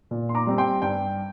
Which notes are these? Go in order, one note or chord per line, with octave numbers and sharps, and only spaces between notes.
A#2
C6
A#5 D6
G3 C4
G5 C6
G2 G5